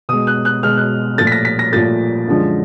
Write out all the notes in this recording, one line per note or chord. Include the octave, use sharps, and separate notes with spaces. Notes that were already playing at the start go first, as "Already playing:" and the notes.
B2 G#3 D#6
F#6
F#6
B2 G#3 F6
F#6
A#2 F3 A3 A6
B6
A#6
B6
A#6
A#2 F3 A3 A6
F#2 D3 F3 G#3